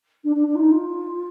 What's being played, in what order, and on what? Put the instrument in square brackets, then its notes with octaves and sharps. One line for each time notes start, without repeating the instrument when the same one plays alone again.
[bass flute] D4
D4
D4
F4
D#4
F4